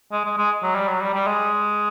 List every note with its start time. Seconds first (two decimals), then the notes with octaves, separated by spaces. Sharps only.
0.12 G#3
0.25 G#3
0.37 G#3
0.63 F#3
0.75 G3
0.88 F#3
1.01 G3
1.14 G3
1.27 G#3